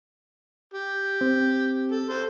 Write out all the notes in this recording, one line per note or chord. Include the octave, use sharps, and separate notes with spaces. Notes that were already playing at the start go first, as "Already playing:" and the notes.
G4
C4
A4
A4 C5